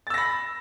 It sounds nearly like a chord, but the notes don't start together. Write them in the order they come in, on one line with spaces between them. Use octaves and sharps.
A6 E6 A#6 B5